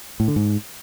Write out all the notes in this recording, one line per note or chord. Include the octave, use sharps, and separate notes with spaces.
A2
D3
G#2